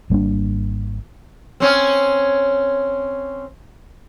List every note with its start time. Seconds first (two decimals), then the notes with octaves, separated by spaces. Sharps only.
0.10 G#1 G3 A#3 D4
1.60 C4 C#4